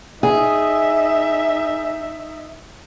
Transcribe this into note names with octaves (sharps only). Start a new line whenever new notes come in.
D#4 G#4 E5